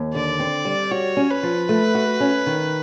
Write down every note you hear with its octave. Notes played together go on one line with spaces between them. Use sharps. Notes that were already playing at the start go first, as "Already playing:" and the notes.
Already playing: D#2
D3 D5
C4
G3
F#4 C#5
C#4
B4
F3
A3
F#4
C#4
D#3